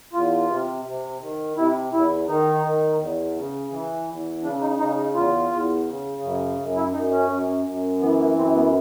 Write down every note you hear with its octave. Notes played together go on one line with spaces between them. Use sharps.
E2 F4
C3
C3
D#3
C3 E4
E2 E4
D#3 D#4
D#3
E2
C#3
E3
E2
C#3 D4
D#4
C#3 D#4
D#4
E2 F4
E2
C#3
F#2
F#2
E4
F#2 D#4
C#4
F#2
F#2
E3 B3
A#3
F#2 C4
B3